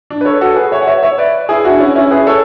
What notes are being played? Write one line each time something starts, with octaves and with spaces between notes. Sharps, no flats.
D4
B4
A4 C#5
B4
F#4 A4
G#4 B4
C#5 E5
F#5
C#5 E5
C#5 E5
B4 D5
E4 G#4
D4 F#4
C#4 E4
C#4 E4
G#4 B4
A4 C#5